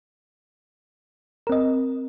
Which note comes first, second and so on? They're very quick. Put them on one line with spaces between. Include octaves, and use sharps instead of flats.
A#4 C4 D#5